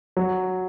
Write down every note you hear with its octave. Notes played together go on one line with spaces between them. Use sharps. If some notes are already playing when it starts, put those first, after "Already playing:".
F#3